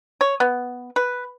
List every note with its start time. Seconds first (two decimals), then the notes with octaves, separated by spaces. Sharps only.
0.21 C#5
0.40 B3
0.96 B4